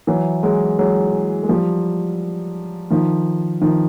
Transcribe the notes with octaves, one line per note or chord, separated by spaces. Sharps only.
E3 F#3
F#3 G#3
F#3 G#3
G#3
F3 G3
D#3 F3
D#3 F3